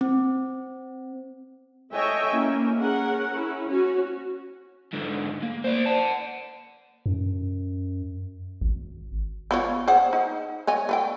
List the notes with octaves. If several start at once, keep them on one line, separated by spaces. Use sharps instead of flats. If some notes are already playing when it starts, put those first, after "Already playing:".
C4
A4 C#5 D#5 E5 G5 G#5
A#3 C#4 E4
C#4 G#4 A#4 F#5
C#4 E4
C#4 F#4
G#2 D3
A#3
C5 D5
F#5 A5
F#2
G#1
B3 F4 C#5
G#4 C5 F#5
D#4
C#5 D#5 G#5
A3 B4 G5